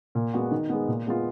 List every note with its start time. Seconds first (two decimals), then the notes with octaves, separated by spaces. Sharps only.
0.15 A#2
0.34 G#3 B3 F#4
0.51 D#3
0.70 G#3 B3
0.88 A#2
1.06 G#3 B3 F4